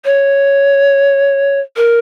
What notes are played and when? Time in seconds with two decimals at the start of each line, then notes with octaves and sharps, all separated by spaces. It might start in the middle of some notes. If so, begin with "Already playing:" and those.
0.05 C#5
1.76 A#4